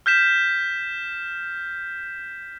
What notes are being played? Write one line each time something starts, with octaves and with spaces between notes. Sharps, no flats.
F6 G6 B6 E7